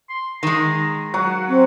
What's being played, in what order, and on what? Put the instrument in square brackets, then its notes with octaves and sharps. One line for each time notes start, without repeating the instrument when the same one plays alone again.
[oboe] C6
[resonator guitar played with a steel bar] D#3 G#3 [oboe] A#5
[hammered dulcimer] F#3 [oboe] F#5
[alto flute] C4